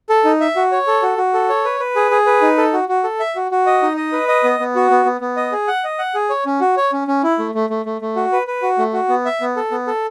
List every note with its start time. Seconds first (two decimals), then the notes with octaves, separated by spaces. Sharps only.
0.09 A4
0.25 D#4
0.40 E5
0.56 F#4
0.72 C#5
0.87 A4
1.02 F#4
1.18 F#4
1.34 A4
1.49 C#5
1.65 B4
1.80 B4
1.96 G#4
2.11 G#4
2.26 B4
2.42 D#4
2.58 A4
2.73 F#4
2.89 F#4
3.04 A4
3.20 E5
3.36 F#4
3.51 F#4
3.66 D#5
3.82 D#4
3.97 D#5
4.12 B4
4.28 D#5
4.44 B3
4.59 B3
4.76 F#4
4.90 B3
5.05 B3
5.21 B3
5.37 D#5
5.52 G#4
5.68 F#5
5.84 D#5
5.99 F#5
6.15 G#4
6.30 C#5
6.46 C#4
6.61 F#4
6.77 C#5
6.92 C#4
7.08 C#4
7.23 E4
7.39 A3
7.55 A3
7.70 A3
7.86 A3
8.01 A3
8.16 F#4
8.32 B4
8.47 B4
8.62 F#4
8.78 A3
8.93 F#4
9.09 B3
9.25 E5
9.41 B3
9.56 A4
9.71 B3
9.87 A4